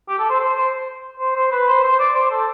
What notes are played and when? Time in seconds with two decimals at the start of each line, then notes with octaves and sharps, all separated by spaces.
0.08 G4
0.19 A4
0.30 C5
0.40 C5
0.56 C5
1.20 C5
1.36 C5
1.51 B4
1.68 C5
1.84 C5
1.99 D5
2.15 C5
2.31 A4